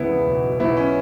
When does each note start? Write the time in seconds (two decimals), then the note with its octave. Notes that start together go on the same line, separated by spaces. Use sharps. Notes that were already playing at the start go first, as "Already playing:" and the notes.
Already playing: C#2 C#3 B3 E4
0.10 E2
0.26 B1
0.43 B2
0.59 B1 B3 E4
0.77 C#4